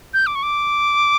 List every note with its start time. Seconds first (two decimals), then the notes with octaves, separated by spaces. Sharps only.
0.14 G6
0.27 D6
0.35 C#6
0.43 D6